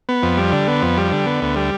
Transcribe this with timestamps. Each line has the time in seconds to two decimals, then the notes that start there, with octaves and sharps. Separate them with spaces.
0.09 B3
0.23 F2
0.37 G3
0.52 D3
0.68 B3
0.82 F2
0.98 G3
1.12 D3
1.26 B3
1.42 D2
1.56 G3